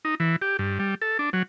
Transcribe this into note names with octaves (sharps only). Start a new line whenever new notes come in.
D#4
E3
G4
G2
G3
A4
D4
F#3